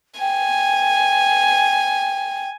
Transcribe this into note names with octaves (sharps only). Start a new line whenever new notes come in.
G5 G#5